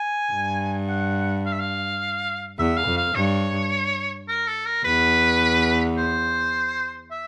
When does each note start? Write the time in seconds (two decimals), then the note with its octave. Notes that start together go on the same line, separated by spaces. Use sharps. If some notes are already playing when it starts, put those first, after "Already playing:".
Already playing: G#5
0.33 G2
0.88 F#5
1.46 F5
1.52 E5
1.59 F5
2.59 E2 E5
2.77 F5
2.87 F2
2.97 F5
3.15 G2 C#5
4.28 A#4
4.47 A4
4.66 A#4
4.84 E2 B4
5.98 C5
7.11 E5